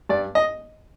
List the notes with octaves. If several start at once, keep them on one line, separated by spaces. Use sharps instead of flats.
G2 D5
D#5